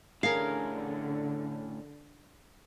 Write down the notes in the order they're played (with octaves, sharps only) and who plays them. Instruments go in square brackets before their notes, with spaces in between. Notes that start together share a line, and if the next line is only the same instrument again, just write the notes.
[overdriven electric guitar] A2 C#4 [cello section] D3 [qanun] G#4 A#4 [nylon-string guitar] F5